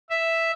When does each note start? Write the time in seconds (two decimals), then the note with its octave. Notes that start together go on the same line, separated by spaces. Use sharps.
0.10 E5